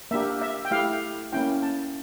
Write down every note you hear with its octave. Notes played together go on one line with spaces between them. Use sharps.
A#3 D4 G4 E5
E5
G5
A3 E4 G4 F5
A#3 C#4 E4 G5
A5